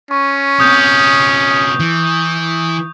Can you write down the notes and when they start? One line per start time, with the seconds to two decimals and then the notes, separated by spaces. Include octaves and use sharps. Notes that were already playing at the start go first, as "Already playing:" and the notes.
0.11 C#4 C#6
0.60 C3 B3 D#6 G6
1.80 E3